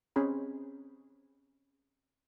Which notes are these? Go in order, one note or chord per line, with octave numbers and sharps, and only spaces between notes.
C4 C#4 G#4 B5